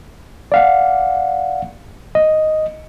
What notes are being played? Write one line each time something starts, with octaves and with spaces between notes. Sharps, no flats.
D5 F5 F#5
D#5